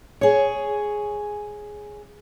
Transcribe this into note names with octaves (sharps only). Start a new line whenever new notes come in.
G#4 C#5